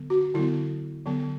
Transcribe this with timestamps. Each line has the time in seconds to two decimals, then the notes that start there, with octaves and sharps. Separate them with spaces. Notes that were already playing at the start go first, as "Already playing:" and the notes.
Already playing: D3 F#3 B3
0.10 F#4
0.35 D3 F#3 B3 E4
1.06 D3 F#3 B3